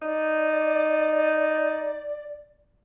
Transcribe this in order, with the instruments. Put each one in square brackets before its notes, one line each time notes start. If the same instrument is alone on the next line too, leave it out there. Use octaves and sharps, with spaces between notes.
[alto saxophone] D#4 [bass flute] D5